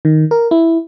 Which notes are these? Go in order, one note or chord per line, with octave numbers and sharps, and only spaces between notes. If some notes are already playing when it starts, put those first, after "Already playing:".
D#3
A#4
E4